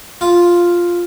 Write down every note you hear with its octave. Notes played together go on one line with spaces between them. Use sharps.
F4